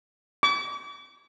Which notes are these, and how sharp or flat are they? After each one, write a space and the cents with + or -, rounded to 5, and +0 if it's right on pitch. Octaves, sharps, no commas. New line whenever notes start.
D6 -40